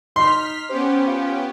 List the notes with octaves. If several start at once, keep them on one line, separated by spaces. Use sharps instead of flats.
D#4 C6 F6 B6
B3 C#4 G4 C5
F4